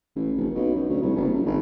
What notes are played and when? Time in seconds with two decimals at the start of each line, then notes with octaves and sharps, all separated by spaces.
0.16 A1
0.37 F1
0.55 B1
0.76 F#2
0.89 D2
1.02 C2
1.16 F#1
1.34 A#1
1.46 G#1